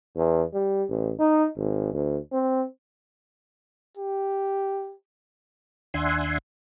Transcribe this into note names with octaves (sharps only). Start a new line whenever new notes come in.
E2
G3
A1
D#4
G#1
D2
C4
G4
D#2 D4 E5 F#5 G#5 C6